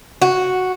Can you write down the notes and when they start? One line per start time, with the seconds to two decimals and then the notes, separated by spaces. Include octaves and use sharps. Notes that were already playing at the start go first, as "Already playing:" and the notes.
0.22 F#4